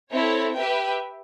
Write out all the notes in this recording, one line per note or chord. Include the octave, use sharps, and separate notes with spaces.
C4 E4 A4 C#5
G4 B4 E5 G5